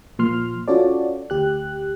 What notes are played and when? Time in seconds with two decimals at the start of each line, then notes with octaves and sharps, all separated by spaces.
0.19 A#2 F3 C6 F6
0.68 C#4 F4 F#4 A4 C#5 D5
1.30 D2 G4 F#6